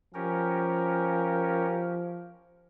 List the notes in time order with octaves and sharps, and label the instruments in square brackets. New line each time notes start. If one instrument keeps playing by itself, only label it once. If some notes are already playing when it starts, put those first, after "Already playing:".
[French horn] F3 [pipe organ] C#4 G4 A#4